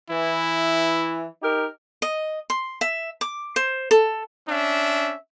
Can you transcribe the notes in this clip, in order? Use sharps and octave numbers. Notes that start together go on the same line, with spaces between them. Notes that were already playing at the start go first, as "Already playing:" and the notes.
E3 E4
D#4 G4 A#4
D#5
C6
E5
D6
C5
A4
C#4 D4 E5